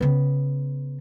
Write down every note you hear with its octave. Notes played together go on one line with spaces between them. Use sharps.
C#3 B3